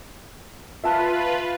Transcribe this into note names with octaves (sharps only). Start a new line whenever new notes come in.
F4 B4 E5 A5